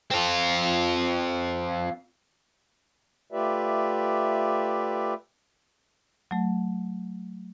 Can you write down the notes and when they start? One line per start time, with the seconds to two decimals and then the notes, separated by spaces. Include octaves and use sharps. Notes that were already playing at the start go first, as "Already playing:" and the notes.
0.11 C4 F4
3.32 A3 F4 G4 B4 D5 E5
6.31 F#3 A3